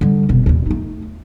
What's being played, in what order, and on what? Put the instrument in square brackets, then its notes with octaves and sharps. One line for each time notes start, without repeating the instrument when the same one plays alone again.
[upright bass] D3 G3
F1 B2
D#2 A#2
A3 D#4